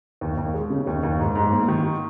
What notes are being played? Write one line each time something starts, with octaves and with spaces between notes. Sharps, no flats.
D#2
D#2
G#3
C#3
D#2
D#2
G#2
G#2
A#3
D#3